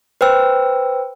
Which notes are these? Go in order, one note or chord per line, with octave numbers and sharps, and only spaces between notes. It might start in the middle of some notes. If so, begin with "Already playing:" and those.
B4 C5 G5 E6